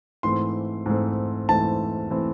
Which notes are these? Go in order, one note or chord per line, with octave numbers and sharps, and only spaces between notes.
G#2 E3 A3 C4 C6
G#2 E3 A3 C4
G#2 E3 A3 C4 A5
E3 A3 C4